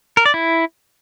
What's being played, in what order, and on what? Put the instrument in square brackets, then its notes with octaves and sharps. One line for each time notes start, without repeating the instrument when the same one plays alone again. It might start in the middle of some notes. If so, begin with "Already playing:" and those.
[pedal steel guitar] A#4
D5
E4